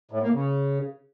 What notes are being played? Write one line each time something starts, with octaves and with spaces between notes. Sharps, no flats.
A2
A#3
C#3